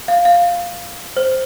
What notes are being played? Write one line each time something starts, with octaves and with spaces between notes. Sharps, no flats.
F5
F5
C5